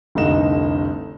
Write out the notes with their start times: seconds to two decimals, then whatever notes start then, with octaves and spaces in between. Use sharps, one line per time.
0.15 F1 C2 D3 D#4 E7